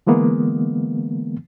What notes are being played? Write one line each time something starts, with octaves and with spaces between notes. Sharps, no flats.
D3 E3 G#3 A#3 B3